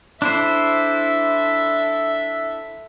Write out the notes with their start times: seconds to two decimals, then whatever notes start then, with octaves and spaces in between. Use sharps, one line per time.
0.22 D4 E4 A4 C5 E5